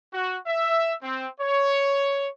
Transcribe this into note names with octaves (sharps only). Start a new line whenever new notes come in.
F#4
E5
C4
C#5